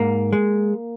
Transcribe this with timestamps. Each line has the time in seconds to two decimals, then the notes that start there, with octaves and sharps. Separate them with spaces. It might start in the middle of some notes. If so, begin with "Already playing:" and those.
Already playing: G#2 A#3
0.33 G#3